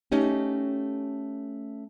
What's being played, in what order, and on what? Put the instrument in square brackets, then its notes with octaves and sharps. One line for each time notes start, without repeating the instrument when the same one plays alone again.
[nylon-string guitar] A3 C#4 D#4 G4